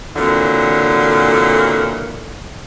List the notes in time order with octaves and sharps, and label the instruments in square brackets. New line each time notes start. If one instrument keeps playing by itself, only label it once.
[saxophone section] A#2 D3 E3 F#3 C4